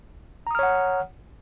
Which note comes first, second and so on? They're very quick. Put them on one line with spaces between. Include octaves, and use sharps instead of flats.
A#5 D#6 F6 C#5 F#5